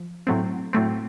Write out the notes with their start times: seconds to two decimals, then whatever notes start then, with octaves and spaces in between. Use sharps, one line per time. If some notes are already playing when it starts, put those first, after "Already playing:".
Already playing: F3
0.27 A2 F#3 A3 C4
0.73 A2 F#3 A3 C4